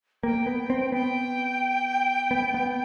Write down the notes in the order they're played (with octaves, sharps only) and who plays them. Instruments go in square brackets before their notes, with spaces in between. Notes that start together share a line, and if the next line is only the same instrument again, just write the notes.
[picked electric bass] A#3 [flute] G5
[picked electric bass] B3
C4
[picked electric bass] B3 [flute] G5
[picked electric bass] B3
B3